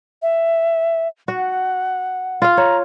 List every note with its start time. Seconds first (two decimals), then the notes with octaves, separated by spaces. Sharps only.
0.22 E5
1.28 F#4 F#5
2.42 F4 F5
2.57 C#5 A#5